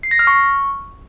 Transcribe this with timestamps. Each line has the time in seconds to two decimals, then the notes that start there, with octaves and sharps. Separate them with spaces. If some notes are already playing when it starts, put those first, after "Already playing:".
0.03 C7
0.11 A#6
0.19 F6
0.27 C#6